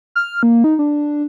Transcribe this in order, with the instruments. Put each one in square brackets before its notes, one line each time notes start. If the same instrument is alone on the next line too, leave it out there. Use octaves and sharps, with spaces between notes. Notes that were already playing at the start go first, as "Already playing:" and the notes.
[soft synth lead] F6
A#3
D#4
D4